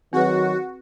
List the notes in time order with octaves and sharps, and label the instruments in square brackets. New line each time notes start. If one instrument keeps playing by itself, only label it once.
[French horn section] D#3 F#3 [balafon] C4 G#4 B4 [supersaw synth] F#4